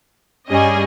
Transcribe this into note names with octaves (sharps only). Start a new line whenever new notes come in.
G2 G3 C#4 G#4 D#5